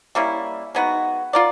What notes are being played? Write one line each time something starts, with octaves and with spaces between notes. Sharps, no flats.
G3 A#3 C#4 E4
G#3 B3 D#4 F#4
F4 A#4 D5